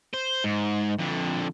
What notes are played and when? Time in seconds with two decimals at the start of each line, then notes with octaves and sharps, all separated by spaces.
0.14 C5
0.44 G#2
0.99 F2 D3